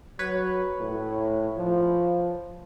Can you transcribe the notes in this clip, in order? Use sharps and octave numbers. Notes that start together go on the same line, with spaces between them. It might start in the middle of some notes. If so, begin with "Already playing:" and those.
F#3 B4 C#5
A2
F3